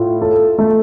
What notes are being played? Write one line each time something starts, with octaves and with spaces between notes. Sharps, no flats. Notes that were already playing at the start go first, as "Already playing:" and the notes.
Already playing: A2 F4
A4
A3